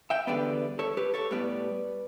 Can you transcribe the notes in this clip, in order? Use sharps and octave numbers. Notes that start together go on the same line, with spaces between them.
E5 G5
E2 D3 G3 B3 B4 D5
A4 C#5
G4 B4
A4 C#5
A2 G3 B3 B4 D5